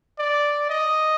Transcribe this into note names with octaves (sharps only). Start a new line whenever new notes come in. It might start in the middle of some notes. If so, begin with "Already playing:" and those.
D5
D#5